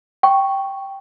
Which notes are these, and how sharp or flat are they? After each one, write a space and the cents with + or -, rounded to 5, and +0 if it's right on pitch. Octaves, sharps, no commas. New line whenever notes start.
G5 +0 C#6 +0